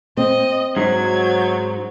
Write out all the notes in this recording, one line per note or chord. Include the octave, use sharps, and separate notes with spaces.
C4 D#5
G#2 F#3 G#6